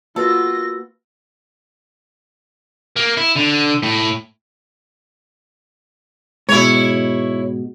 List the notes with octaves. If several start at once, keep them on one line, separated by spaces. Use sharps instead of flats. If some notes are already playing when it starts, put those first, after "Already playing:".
A#3 F4 F#4 A4 B4 A#6
A#3
E4
D3
A2
G#2 B2 E4 C#5